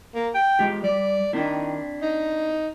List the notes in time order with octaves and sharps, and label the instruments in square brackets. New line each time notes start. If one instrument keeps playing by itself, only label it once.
[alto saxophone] A#3
G5
[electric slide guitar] G#3 F4 G4
[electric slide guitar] G3 [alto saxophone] D5
[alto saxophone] D#3 [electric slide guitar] C4 D4 E4
[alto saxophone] D#4